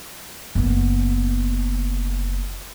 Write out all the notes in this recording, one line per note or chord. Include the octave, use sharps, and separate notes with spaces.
F#1 B3